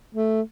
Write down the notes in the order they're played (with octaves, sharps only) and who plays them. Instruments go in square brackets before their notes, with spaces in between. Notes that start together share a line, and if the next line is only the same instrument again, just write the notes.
[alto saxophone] A3